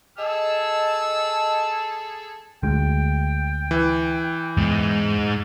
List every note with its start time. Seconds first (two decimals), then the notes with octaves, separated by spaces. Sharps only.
0.18 G#4 A4 D#5 A5 E6
2.63 D2 G#3 G5
3.71 E3
4.57 E2 G#2 G#3